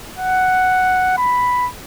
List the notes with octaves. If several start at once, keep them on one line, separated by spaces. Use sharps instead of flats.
F#5
B5